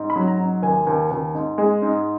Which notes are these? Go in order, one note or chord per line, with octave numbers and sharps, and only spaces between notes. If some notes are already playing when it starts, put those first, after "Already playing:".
Already playing: G#2
B5
F#3
A#5
G#2
D#2 G#5
D#2
D#2
G#2
G#3
G#2